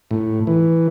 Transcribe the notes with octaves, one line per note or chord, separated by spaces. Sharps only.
A2
E3